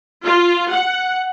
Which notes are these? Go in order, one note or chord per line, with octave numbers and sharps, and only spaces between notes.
F4
F#5